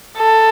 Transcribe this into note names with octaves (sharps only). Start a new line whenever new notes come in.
A4